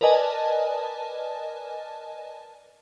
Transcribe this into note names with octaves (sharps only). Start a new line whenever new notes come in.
A#4 B4 D5 D#5 G#5 A5